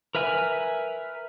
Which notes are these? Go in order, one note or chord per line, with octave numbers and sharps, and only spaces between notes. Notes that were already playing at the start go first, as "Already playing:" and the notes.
A#4 B4 E5 G#5 F6